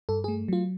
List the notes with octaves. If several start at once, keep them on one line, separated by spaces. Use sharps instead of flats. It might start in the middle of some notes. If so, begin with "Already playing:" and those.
G2 A4
A3 G#4
F#3 F4